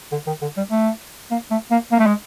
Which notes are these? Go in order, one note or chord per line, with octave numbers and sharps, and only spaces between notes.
D3
D#3
D3
G3
A3
A#3
A3
A#3
A#3
A3
G#3